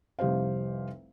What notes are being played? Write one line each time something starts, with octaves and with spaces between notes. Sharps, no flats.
F1 C2 G4 C5 F5